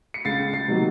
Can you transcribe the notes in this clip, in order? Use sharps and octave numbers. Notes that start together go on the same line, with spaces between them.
C#7
C#2 A6 C7
A6 C7
C3 D#3 F#3 A#3